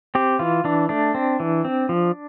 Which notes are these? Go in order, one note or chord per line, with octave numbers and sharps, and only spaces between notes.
C4 G4
E3 F4
E3 D4
A3 D4
C4
E3
C4
F3